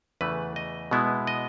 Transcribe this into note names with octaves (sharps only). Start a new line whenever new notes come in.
E2 C#3 E3 A3 B4
D#5
B2 G#3 B3 E4
D#5